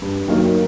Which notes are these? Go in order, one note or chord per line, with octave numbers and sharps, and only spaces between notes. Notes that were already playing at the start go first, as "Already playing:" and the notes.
G2
D#3 F#3 A#3 D#4